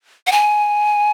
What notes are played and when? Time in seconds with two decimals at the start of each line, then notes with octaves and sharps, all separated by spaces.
0.27 F#5
0.32 G#5